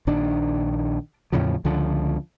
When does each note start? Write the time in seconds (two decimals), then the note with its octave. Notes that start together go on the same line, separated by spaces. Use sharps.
0.07 A#1 D#3 D4
1.32 E2 A2 C#3 F3
1.65 C#2 D3 F3